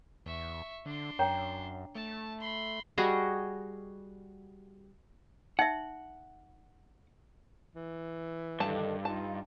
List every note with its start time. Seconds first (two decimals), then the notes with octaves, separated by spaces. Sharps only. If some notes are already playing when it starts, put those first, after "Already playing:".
0.26 E2 E5 C#6
0.86 D3 D4 C6
1.19 F#2 C#5 G5 A#5
1.95 A3 A5
2.40 B5 C6
2.98 G3 F#4 G#4 D#5
5.59 D#4 E5 F#5
7.75 E3
8.60 G2 D3 D#3 A5
9.05 D#4 F4 A5